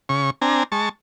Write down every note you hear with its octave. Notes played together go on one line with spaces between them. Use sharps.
C#3 C#6
C4 D4 G#5 A#5
G#3 A5 C#6